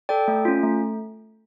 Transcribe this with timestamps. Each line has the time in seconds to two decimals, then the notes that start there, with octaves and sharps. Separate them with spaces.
0.09 A4 D5 G5
0.28 A3
0.45 C#4 F4
0.63 A3